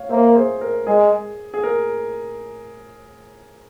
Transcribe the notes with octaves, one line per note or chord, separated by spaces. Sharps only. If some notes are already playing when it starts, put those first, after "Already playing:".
Already playing: C#5 F5
A#3 C5 E5
G#4 C5
A#4
G#3 G#4
G#4
A#4